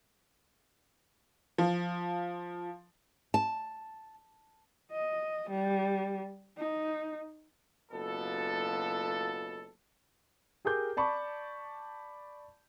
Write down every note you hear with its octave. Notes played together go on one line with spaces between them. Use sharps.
F3
A5
D#5
G3
D#4
F#1 B2 F4 A4
G4 G#4 A#4 D6 G6
D5 A5 B5 C#6 D6